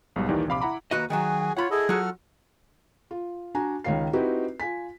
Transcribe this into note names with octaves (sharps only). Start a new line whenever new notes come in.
B1 G#2 B2 G3
D#2 D#3 E3 D#4 G4 D5
A#1 C3 F5 B5 D6
E4 F#5 A#5 B5 D6
D#2 F#4 B4 D#5 A#5
D#3 E3 F#3 F#4 G#4 G#5
F4 C#5 F#5 B5
E4 G#4 A4 D#5
F#3 F4 F#4 A4 F#5 F6
F4
D4 F#4 G#5 A#5
C#2 D#3 C#5 F5 C7
C4 D#4 E4 F#4 G4 B4
F4 G#5 B6